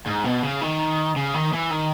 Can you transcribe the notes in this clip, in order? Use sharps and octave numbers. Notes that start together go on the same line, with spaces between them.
G#2
B2
C#3
D#3
C#3
D#3
E3
D#3